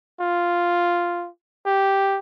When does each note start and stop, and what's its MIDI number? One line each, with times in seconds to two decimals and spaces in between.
0.20 1.29 65
1.66 2.19 67